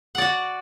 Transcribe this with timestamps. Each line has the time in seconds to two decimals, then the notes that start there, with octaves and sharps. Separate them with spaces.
0.15 F#5
0.18 D5
0.22 F#4